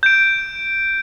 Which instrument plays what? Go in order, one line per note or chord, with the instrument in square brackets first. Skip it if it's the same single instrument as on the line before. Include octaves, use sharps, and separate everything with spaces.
[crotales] G6 D7